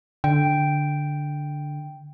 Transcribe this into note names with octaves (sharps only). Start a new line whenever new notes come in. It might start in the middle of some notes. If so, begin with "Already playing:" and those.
D3 G5